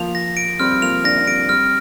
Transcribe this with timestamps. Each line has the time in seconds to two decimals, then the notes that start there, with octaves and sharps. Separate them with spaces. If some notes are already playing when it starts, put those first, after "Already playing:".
Already playing: F3 A#3 F7
0.15 A#6
0.37 D7
0.60 G3 C4 F6
0.82 F3 A#3 F7
1.04 A#3 D4 A#6
1.17 D4
1.27 G3 C4 D7
1.49 G3 C4 F6